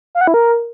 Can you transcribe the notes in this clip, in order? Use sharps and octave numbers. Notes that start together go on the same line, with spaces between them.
F5
F#5
E4
A#4